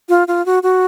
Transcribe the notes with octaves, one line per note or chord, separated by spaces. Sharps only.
F4
F4
F#4
F#4